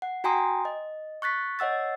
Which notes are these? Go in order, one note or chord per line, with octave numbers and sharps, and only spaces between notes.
F#5
F#4 G5 G#5 A#5 C6 D#6
D#5
C#6 F#6 A6 B6
C#5 D#5 F#5 E6 A6